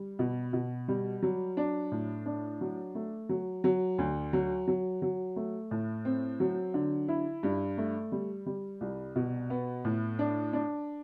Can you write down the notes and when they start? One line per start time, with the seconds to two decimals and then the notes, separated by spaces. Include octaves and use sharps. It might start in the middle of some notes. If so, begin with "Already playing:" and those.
Already playing: G3
0.19 B2
0.53 B2
0.88 G3
1.22 F#3
1.57 D4
1.92 A2
2.26 D4
2.61 F#3
2.95 A3
3.29 F#3
3.64 F#3
3.98 D2
4.33 F#3
4.68 F#3
5.02 F#3
5.36 A3
5.71 A2
6.05 C4
6.40 F#3
6.74 D3
7.08 E4
7.43 G2
7.78 A3
8.12 G3
8.46 G3
8.81 C2
9.16 B2
9.50 B3
9.85 A2
10.19 D4
10.53 D4